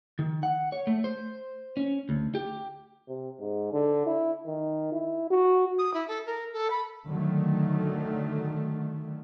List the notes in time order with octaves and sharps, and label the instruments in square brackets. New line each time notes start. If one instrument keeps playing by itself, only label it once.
[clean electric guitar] D#3
F#5
C#5
A3
C5
C#4
D2
G4
[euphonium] C3
G#2
D3
E4
D#3
E4
F#4
[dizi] D#6
E4
A4
A#4
A4
B5
[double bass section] D3 D#3 F#3 A3